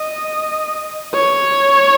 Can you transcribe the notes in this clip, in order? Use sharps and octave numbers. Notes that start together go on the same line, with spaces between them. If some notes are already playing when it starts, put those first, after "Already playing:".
Already playing: D#5
C#5